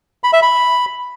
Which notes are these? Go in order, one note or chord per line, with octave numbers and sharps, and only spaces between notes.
B5
E5
B5